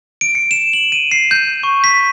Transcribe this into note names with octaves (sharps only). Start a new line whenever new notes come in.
D7
C#7
E7
F#7
D#7
C7
G6
C#6
B6